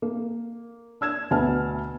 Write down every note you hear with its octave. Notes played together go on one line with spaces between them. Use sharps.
A#3
D4 E6 G#6 E7
D2 B2 B3 G#5 A5 F6